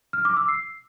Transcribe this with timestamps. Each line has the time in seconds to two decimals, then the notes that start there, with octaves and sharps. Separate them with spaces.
0.13 F6
0.25 D6
0.37 E6
0.49 C7